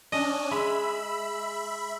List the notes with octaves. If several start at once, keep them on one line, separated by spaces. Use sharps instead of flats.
C#4 D4 D#5
G#3 E5 B5